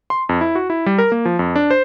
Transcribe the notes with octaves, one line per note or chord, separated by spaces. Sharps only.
C6
F2
E4
F#4
E4
G3
A#4
A#3
F3
F2
D4
C5